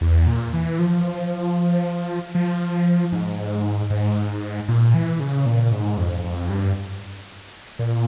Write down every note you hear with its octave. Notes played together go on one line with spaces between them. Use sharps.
E2
A#2
E3
F3
F3
G#2
G#2
A#2
E3
C#3
A#2
G#2
F2
F2
G2
A#2